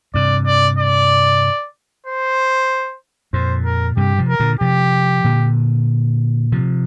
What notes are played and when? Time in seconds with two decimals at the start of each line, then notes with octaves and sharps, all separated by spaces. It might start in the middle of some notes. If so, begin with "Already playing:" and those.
0.14 G2 C3 D5
0.46 D5
0.78 D5
2.06 C5
3.33 F2 A#2 C5
3.65 A#4
3.97 G2 C3 G4
4.18 C3 F3
4.29 A#4
4.40 A#2 D3
4.60 C3 F3 G4
5.24 A#2 D3
6.52 C3 F3